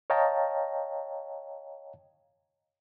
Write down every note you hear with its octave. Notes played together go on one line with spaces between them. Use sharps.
C#5 D#5 F5 G5 A5 A#5